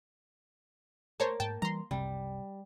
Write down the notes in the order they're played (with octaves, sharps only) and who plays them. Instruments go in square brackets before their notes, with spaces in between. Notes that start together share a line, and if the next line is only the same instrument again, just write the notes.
[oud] A#3 [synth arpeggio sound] C5 C#5 A5
[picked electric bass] G#2 [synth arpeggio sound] G5 A5
[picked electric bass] E3 G3 [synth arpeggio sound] A#5 C6
[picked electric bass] F#1 C2 C3 [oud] G3